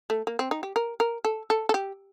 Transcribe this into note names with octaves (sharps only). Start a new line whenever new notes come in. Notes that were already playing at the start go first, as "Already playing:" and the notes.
A3
A#3
C4
D#4
G4
A#4
A#4
A4
A4
A4
G4